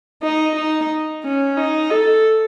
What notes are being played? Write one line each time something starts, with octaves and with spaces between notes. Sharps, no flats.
D#4
D#4
C#4
D#4
A4